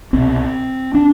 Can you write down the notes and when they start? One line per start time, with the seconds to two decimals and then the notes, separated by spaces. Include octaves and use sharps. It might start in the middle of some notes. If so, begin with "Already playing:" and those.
0.13 C2 B2 C4
0.94 D4